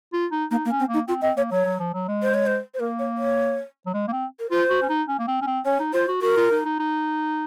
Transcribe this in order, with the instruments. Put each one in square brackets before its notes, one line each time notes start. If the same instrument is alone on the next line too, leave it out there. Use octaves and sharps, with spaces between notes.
[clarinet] F4
D#4
[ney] A#3 [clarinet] D#4
[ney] A#3
[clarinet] C#4
[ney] C4
[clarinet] A#3
[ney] D#4
[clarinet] C4 [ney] F4
[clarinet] C4 [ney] D#5
[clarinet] A#3 [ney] C#5
[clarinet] F#3 [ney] C#5
[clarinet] F#3
F3
F#3
G#3
[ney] C5
C#5
C5
C5
[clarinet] A#3 [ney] A#4
[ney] C#5
C#5
[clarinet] F#3
G#3
A#3
C4
[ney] A#4
[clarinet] F4 [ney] C5
[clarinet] F#4
C#4
D#4
C#4
A#3
C4
C#4
C4
[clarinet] C#4 [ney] C#5
[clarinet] D#4
[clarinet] F4 [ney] C5
[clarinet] F#4
[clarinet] F#4 [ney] A#4
[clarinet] F4
D#4
D#4
D#4